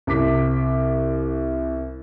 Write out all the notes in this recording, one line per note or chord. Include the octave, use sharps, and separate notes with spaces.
C2 D6 B6